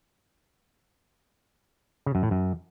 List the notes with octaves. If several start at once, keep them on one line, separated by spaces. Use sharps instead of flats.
C#3
F#2
A2
F#2